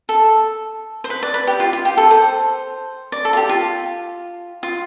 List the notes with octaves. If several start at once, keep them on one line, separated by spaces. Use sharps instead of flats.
A4
C5
B4
D5
B4
G4
F4
F4
G4
A4
C5
D5
A4
F4
G4
F4
F4